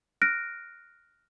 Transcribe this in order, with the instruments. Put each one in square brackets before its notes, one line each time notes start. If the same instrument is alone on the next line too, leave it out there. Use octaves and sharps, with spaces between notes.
[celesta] F6 F#6 A#6 D7